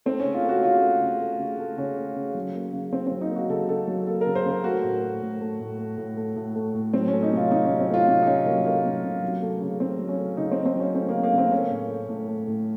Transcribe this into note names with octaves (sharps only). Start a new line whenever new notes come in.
A3 C4
C#4
C#3
F4
A3 F#4
C#3 F4
A3
C#3
A3
C#3
A3
C#3 C#4
A3
C#3
F#3
A#3
C#3
C#3 C4
F#3 C4
D#4
A#3
F#4
C#3 A4
C#3 A4
F#3
A#3 A4
C#3 A#4
C5
C#3 A#4
A3 F#4
A2
A3
A2
A3
A2
A3
A2
A3
A2
A3
A2
F#3 C4
C#4
A3
D#4
C3 F4
C3 D#4
F#3 C#4
C4
A3 F4
C3 D#4
D#4
C3 C#4
F#3 A#3
A3 A#3
C3
C3
F#3
A3
C#3
C#3 C4
F#3
C#4
A3
C#3 D#4
C#3 C4
C4
F#3 C#4
A3 C4
C#3 A#3
A#3
C#3 C4
A3 C#4
A2
A3
A2
A3
A2